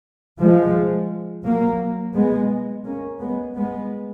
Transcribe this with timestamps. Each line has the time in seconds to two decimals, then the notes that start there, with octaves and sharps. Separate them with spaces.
0.40 F3 G#3
1.45 F#3 A#3
2.15 G#3 B3
2.85 A#3 C#4
3.21 G#3 B3
3.56 G#3 B3